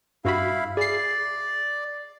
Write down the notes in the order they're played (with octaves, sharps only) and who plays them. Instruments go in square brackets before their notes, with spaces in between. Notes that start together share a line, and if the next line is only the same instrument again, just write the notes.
[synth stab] G2 F#4 B5 [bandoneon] E4 F5
[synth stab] G#4 C7 [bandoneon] D5